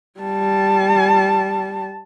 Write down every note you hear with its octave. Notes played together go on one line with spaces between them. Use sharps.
G3 A5